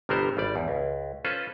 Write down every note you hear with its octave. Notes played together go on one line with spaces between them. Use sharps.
G1 C3 G3 B3 A#4 C5
G#1 G3 D5
E2
C#2
C#4 F4 A4 B4 C5